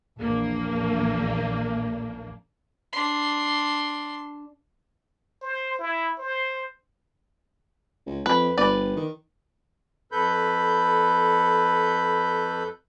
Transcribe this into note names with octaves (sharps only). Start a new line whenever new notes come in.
A#1 E2 A#3 D4
D4 C6
C5
E4
C5
C#2
F2 B4
G1 B4 D5
D#3
F2 A4 B4 B5 G6